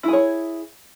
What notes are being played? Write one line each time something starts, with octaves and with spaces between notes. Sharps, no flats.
E4 G#4 C#5